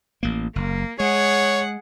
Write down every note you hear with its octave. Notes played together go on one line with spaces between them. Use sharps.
A1 A#3
F#1 A#3
G#3 G#4 C#5 F#5